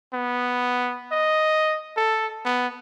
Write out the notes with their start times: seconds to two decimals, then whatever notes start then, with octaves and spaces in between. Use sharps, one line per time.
0.14 B3
1.11 D#5
1.97 A4
2.45 B3